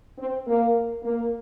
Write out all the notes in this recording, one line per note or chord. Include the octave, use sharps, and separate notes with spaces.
C4
A#3
A#3